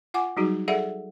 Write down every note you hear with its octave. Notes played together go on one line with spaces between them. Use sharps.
F4 F#5 G#5 D6
F#3 G3 D#4 F#4 G#4
G#4 A4 D5 E5 F#5